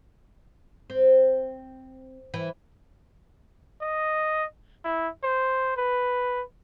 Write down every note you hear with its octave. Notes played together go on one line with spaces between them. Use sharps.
C4
E3
D#5
E4
C5
B4